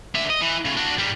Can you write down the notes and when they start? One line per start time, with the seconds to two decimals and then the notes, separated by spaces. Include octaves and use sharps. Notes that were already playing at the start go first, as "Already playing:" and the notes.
0.15 D3 E5
0.30 D#5
0.41 E3
0.65 A2 C#3
0.77 D4 F#4
0.98 G#2 G3